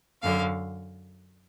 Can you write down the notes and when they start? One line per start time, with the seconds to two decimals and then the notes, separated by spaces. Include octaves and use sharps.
0.22 F#2 D3 F5